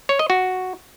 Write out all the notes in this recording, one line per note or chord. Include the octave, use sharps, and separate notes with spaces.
C#5
D#5
F#4